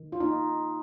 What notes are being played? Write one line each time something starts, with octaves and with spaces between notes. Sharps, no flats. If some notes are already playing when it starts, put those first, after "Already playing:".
Already playing: D#3
F4
A#3 D#4